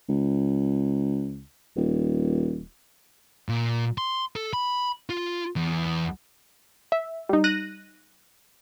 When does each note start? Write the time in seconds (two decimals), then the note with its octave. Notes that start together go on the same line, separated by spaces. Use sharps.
0.09 C#2
1.76 D#1
3.49 A#2
3.98 C6
4.36 A4
4.53 B5
5.10 F4
5.56 E2
6.92 E5
7.29 G3 D#4
7.44 F#6 A#6 D#7